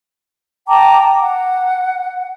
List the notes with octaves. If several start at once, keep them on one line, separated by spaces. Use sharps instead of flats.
G5 A5 A#5 D6
F#5